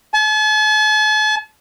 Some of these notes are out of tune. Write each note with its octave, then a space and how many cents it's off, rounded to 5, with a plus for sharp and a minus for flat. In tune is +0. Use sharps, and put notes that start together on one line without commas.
A5 -45